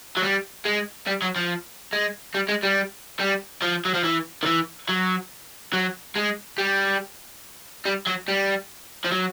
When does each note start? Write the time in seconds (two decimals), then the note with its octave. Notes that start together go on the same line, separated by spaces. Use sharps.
0.17 F#3
0.22 G3
0.65 G#3
1.07 G3
1.22 F#3
1.36 F3
1.93 G#3
2.34 G3
2.48 G#3
2.63 G3
3.19 G3
3.62 F3
3.85 F#3
3.94 F3
4.04 E3
4.43 D#3
4.46 E3
4.89 F#3
5.73 F#3
6.16 G#3
6.58 G3
7.86 G3
8.07 F#3
8.28 G3
9.04 F3
9.12 F#3